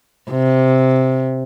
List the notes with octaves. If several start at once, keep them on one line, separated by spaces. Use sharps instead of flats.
C3